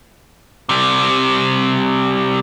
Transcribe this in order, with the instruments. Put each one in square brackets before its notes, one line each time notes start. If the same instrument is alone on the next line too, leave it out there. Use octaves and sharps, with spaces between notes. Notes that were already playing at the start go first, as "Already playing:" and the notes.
[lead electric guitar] C3 G3